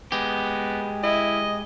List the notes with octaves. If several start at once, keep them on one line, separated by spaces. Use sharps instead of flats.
G#3 B3 G4
E4 D#5